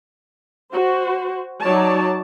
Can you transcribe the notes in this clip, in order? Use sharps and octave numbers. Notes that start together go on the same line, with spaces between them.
F#4 C5
F#3 D#4 C#5 D5 A5